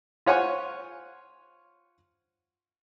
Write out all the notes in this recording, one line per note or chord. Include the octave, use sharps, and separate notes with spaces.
F4 C5 C#5 F#5 G#5 C#6